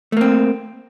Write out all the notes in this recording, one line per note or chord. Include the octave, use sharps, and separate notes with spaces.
A3 A#3 C4